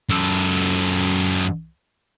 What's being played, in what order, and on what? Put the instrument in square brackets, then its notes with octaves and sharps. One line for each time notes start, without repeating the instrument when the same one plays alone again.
[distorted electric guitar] F#2 A4